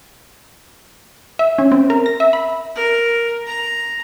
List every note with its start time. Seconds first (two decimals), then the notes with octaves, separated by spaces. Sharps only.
1.39 E5
1.58 C#4
1.72 C4
1.90 A#4
2.06 A#6
2.20 E5
2.33 B5
2.76 A#4
3.47 A#5